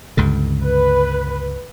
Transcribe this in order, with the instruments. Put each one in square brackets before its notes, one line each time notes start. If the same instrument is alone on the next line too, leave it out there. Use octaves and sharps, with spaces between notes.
[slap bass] C#2 G2 D3
[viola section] B4